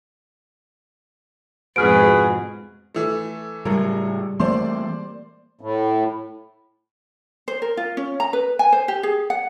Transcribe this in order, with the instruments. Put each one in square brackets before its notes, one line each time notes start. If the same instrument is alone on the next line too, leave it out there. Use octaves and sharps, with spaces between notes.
[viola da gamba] F2 G#2 B2 [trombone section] F#4 G#4 B4 [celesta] F6 D7
[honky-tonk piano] E3 A3
[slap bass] A2 C#3 [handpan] G3 G#3 [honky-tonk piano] A#4
[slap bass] E3 A3 C4 [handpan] A#3 [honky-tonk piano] C5 D5 C6
[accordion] A2
[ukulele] C5
A#4
F4
C#4
A#5
B4
G#5
C5
G4
G#4
F#5